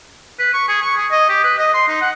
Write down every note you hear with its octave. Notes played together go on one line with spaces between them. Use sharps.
B4
C#6
G#4
C#6
G#4
D#5
G4
B4
D#5
C6
D#4
F#5